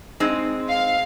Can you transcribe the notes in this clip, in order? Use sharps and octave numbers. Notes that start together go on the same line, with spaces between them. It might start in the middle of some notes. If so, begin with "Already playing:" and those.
G#3 C4 D#4
F5